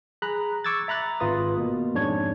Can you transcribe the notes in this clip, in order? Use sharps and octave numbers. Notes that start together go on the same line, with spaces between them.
G#4 A#5 B5 F#6
C#6 D6 E6 G#6 A6
E5 A#5 B5 F#6 A6
G#1 F4 B4 D#6
B2 A#3
F2 G#2 D4 C#5 G#6